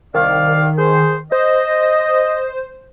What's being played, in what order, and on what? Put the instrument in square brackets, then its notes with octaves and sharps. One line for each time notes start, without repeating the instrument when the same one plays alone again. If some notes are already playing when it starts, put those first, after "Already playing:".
[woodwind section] C2 D5 F5 [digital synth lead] D#3
[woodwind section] G#4 C5
[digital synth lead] C5 [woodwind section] D#5